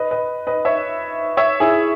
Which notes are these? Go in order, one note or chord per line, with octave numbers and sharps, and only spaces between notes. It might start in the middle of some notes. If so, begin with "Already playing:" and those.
Already playing: B4 D#5
B4 D#5
B4 D#5
C#5 E5
C#5 E5
E4 G#4